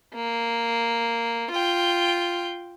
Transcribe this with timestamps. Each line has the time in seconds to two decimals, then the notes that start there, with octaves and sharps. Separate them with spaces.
0.15 A#3
1.52 F4 G5